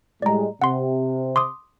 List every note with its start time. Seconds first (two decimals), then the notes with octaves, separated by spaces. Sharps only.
0.22 A2 G3 G#3 D5 A#5
0.62 C3 F#5 C6
1.36 C6 D6 D#6